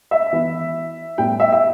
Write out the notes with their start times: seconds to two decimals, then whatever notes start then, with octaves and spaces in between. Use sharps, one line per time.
0.11 E5
0.33 E3 B3 E4
1.18 A2 G3 B3 G5
1.40 E5
1.52 E5